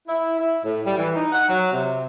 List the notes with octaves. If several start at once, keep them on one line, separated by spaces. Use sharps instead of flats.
E4
E4
A2
G3
E3
D#4
F#5
F#3
C3